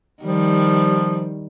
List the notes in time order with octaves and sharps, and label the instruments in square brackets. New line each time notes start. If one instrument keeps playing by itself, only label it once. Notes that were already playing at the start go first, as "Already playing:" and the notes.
[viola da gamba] D#3 G3 [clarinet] F3